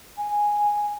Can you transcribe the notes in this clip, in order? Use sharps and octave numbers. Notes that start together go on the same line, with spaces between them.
G#5